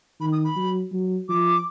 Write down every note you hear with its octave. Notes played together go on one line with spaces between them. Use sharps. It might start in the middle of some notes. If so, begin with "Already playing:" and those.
D#3 B5
D#6
B5
F#3
F#3
F3 D6